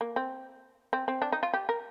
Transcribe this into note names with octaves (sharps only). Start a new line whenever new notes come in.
A#3
C4
C4
C4
D4
D#4
F4
G4
A#4